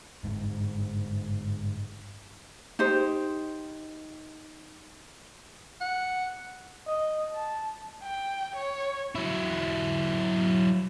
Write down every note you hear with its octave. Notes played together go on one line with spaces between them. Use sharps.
G1 G#2
D#4 G4 C5
F#5
D#5
A5
G5
C#5
F#3 E4